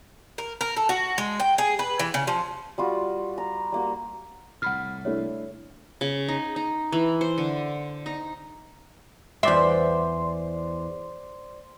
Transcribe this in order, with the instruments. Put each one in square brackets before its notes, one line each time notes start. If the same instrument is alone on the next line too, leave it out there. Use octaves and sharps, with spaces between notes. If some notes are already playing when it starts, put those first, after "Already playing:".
[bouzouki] A#4
A#4
A4
F#4
G#3
G5
G#4
B4
E3
C#3
F3
[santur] G3 F4 F#4
A#5
G3 A#3 F#4
[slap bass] C2 A2 [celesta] F#5 B5 F6
[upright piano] A3 D4 E4 [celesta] C#5
[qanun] C#3
D#4
D#4
E3
C5
D3
D#4
[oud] E2 E5 [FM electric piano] C5 D5 C6